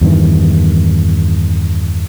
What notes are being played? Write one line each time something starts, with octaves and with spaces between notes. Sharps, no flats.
E2 G2 D#3 E3